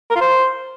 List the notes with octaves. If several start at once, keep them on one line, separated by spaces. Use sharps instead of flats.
A#4
F4
C5